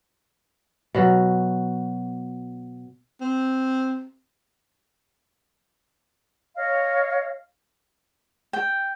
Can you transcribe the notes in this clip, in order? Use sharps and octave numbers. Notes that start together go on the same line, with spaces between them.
B2 F#3
C4
C#5 D#5 F5
G5